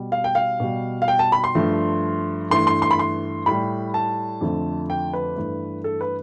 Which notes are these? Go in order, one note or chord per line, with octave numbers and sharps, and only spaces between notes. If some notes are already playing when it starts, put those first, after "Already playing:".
Already playing: B2 G3
F5
G5
F5
B2 G3
F5
G5
A5
B5
C6
G2 F3 A3
G2 E3 A3 C6
C6
C6
B5
C6
A2 G3 B5
A5
F2 D3 F3 A3
G5
B4
G2 E3 A3
A4
B4